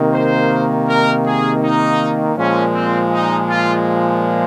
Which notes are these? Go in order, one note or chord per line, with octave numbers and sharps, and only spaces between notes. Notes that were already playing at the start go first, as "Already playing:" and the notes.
Already playing: C3 D#3 A#3
C5
A#4
G#4
D#4
A#2 F3 G#3 C#4
C4
D#4
F4